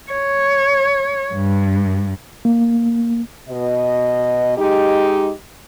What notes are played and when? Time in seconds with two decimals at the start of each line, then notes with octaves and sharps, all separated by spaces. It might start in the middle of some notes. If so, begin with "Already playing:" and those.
0.11 C#5
1.34 G2
2.45 A#3
3.48 B2 D#5
4.57 G#3 D#4 G4